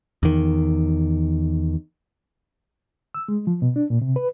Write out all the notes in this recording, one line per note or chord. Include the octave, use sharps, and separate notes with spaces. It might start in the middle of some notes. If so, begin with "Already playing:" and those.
E2 D#3
E6
G#3
F3
B2
D4
A#2
C3
B4